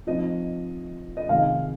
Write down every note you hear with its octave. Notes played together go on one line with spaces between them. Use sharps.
F3 C4 D#4 D#5
D#5
C3 D#3 G#3 F5